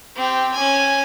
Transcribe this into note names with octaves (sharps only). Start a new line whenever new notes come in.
C4 G4
C#4 G#5